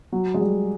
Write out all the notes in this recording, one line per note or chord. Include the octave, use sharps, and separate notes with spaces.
F#3
G#3
G3